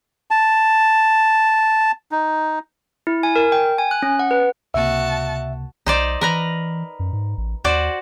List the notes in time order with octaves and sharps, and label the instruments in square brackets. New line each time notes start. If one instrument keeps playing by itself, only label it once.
[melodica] A5
D#4
[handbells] E4
G#5
A#4
G5
G#5
F#6
C#4
F#5
B4
[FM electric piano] C#2 C3 A#3 [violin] F#4 A5 [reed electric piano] E5
[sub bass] B1 [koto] D#4 C5 D5
[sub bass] E3 [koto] A#4 B4 A#5
[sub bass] F#2
G#2
A1
[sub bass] D#2 [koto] F#4 C5 D5